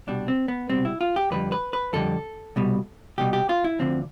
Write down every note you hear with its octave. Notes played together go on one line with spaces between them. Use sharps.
C2 B2 G3 D4
C4
B3
C2 B2 G3 C4
E4
F4
G4
F2 D3 G3 B4
B4
B4
F2 D3 G3 A4
C2 B2 G3
C2 B2 G3 G4
G4
F4
E4
D2 D3 F3 C4